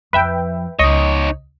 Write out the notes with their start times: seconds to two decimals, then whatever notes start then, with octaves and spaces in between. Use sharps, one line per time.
0.13 F2 F3 B4 E5 G5
0.79 C#2 D#4 C#5 D#5